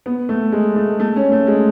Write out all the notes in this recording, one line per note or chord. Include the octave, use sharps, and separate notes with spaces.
B3
A3
G#3
A3
A3
C#4
A3
G#3